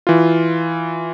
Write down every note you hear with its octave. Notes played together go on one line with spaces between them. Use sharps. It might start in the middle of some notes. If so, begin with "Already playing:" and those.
E3 F4